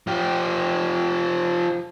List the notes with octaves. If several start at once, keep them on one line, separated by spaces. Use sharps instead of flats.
F3 G4